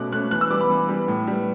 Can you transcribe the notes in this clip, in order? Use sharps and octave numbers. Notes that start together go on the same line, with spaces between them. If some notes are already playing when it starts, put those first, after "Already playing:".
Already playing: B2 A3 C#4 D6 F#6
A3 C#4 F#6
E3 F#6
E6
G3 B3 D6
B5
E3
G3 B3
A2
G3 B3